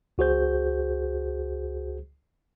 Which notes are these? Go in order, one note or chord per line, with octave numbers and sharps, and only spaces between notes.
C#2 F#4 G#4 C5 G6